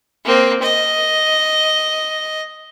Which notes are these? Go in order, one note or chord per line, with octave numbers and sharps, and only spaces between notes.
A#3 C4
D#5